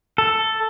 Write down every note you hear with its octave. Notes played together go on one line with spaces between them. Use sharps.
A4